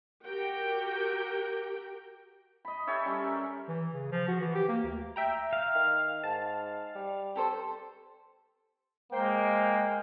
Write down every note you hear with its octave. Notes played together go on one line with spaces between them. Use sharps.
F#4 G4 A#4 G5
D#5 B5
G4 A4 C#5 E5
G3 C#4 C6
A#4
E3
C#3
F3
F#4
E3
G4
A#3
D2
E5 G5 A#5
F5
D#3
G#2 A5
G3
G4 A4 C5
G#3 A#3 C5 G5